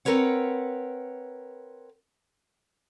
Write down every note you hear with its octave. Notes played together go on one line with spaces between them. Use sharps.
C4 A#4 B4 C#5 F#5